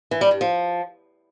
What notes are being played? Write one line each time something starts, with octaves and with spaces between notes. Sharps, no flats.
E3
G3
G2
F3